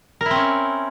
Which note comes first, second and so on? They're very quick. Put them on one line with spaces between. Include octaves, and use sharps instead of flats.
A#4 E4 C4 C#4